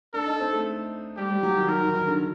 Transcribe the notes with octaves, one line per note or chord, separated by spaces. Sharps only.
D4 A4
D#4
C4
A3
G3 G4
G3
F#3
D#3
D#3 A#4
D#3
D#3
D3